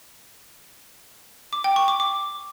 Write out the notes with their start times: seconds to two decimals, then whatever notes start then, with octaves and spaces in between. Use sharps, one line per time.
1.53 D6
1.64 G5
1.76 C#6
1.88 D6
2.00 D6